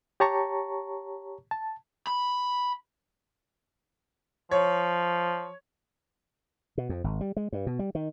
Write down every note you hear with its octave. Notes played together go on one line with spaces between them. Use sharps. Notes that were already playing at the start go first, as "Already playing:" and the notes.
G4 C#5 A5 A#5 C#6
A5
B5
F3 C#5
B2
F2
G#1
G3
G#3
G2
B2
G3
D#3